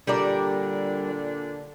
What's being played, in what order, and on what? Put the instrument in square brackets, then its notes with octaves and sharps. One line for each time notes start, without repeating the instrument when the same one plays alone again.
[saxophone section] A#2 D3 D4 [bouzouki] G3 A#4 D5